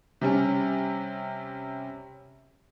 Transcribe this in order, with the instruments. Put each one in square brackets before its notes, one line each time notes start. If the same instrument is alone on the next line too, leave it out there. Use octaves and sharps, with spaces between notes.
[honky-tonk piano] C3 G3 C#4